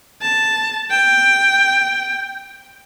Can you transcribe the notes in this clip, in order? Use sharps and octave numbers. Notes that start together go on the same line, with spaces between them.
A5
G5